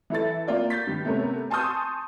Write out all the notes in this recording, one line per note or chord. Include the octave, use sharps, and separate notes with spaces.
E3 E4 A4 A6
A#3 C4 F4 D5
G6 A6 B6
G2 D#3
C3 A3 B3 C#4 A#4
G#5 A5 C6 C#6 D#6 G6